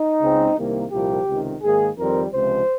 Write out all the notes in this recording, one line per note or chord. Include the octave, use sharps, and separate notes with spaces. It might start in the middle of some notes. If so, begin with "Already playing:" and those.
Already playing: D#4
C#2 C#3 G#3 C4
C2 C3 D#3 A#3
C2 A#2 F3 A#3 G4
C#2 C3 D#3
G#2 D#3 A#3 G#4
F2 D#3 G3 C4 A#4
C#2 C3 F3 G#3 C5